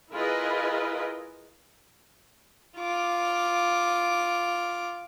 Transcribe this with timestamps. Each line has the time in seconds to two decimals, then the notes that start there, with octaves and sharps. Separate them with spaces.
0.12 E4 F4 G#4 A#4 B4 D#5
2.78 F4 D6